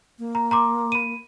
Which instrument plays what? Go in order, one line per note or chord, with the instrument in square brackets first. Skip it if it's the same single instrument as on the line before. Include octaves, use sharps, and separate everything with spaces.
[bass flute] A#3
[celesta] A#5
A#5 C6 D6
B5 D#7